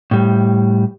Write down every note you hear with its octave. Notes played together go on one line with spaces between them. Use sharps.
A2 G3